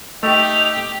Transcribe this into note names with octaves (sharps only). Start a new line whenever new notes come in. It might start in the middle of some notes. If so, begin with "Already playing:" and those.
A3 D#4 G4 F7